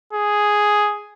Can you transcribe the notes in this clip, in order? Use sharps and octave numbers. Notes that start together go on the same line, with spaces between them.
G#4